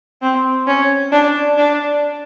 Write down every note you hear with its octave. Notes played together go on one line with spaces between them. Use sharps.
C4
C#4
D4
D4